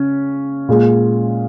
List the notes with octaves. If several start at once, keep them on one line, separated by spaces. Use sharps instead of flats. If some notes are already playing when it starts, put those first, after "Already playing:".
Already playing: C#3 C#4
A#2 G#3